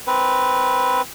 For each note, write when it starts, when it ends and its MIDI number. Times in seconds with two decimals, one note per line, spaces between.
0.07 1.01 60
0.07 1.01 71